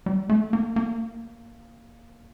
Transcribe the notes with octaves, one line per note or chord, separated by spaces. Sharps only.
G3
A3
A#3
A#3